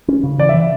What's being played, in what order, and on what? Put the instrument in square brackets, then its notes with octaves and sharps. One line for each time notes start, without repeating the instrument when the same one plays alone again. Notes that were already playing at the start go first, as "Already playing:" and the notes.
[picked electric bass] C#4
C#3
[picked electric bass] E3 [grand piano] D5
[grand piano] E5
[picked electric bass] E3